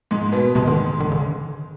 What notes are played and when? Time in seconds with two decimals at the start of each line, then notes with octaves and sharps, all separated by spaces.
0.11 G#2 G#3
0.32 B2 B3
0.55 G#2 C3 G#3
0.67 D#3
0.79 D3
1.00 D#3
1.12 D3